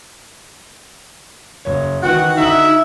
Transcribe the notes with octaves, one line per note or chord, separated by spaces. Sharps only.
F#1 C#5
D#3 E3 F#4 F#5 G5
D3 D#4 E5 F#7